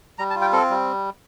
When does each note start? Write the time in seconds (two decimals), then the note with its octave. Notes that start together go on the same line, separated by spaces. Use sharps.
0.19 G3 A#5
0.30 A5
0.35 F4
0.41 G5
0.53 C4 A4
0.70 G3